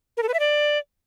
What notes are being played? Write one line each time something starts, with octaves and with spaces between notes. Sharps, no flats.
A#4
A4
B4
E5
D5